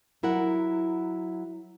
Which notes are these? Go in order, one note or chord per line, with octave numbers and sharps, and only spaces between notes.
F#3 E4 A#4 F#5